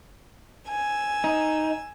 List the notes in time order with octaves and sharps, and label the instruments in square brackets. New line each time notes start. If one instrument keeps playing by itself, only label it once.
[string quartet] G#5 E6
[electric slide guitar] D#4